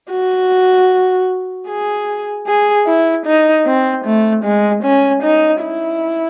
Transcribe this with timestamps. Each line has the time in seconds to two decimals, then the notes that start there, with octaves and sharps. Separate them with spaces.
0.11 F#4
1.68 G#4
2.47 G#4
2.87 E4
3.26 D#4
3.66 C4
4.05 A3
4.44 G#3
4.83 C#4
5.23 D#4
5.62 E4